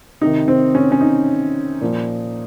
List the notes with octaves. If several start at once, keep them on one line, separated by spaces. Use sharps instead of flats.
C3 D#3 D#4
C4
C#4
C#4
D#4
A#2 F3